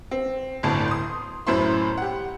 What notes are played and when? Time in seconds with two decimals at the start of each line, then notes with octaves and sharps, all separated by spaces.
0.11 C4
0.63 G1 D2 A2 A5
0.88 C6 D#6
1.47 F#2 A2 E4 C5 B5 C6
1.98 G4 F#5